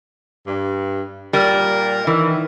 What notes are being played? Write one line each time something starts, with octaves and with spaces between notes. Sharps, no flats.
G2
A#2 G3 A#4
D#3 E3